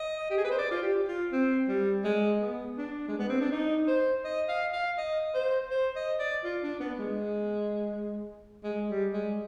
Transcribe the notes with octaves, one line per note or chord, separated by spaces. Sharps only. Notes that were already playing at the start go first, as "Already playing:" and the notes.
Already playing: D#5
G4
G#4
B4
C5
D5
F4
G4
F4
C4
G3
G#3
B3
D4
G#3
B3
C4
D4
D#4
C5
D#5
F5
F5
D#5
C5
C5
D#5
D5
F4
D4
B3
G#3
G#3
G3
G#3